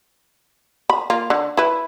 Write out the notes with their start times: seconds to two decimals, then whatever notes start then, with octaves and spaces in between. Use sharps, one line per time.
0.90 B5
1.10 A#3 F4
1.30 D3
1.57 E4 B4